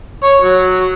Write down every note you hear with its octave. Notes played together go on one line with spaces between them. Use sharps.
C#5
F#3